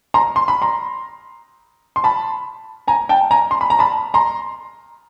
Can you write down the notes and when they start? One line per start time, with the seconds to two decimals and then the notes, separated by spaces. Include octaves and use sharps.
0.14 A#5 C6
0.36 C6
0.48 B5
0.62 A#5 C6
1.96 C6
2.04 A5 B5
2.88 G#5 A#5
3.09 G5 A5
3.31 G#5 A#5
3.51 C6
3.61 B5
3.70 A#5
3.79 A5 B5
4.14 A#5 C6